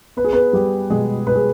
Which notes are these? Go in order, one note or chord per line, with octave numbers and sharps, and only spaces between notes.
B3 B4
G#4
B3 B4
G3 G4
B2 G#3 G#4
B2 B4
G#4